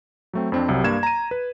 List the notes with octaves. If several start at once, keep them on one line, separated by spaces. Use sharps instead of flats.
F#3 A3 C4
F2 C4 D4
C2 C3 F#3
G2 A#3 G#6 E7
A#5 D#7
B4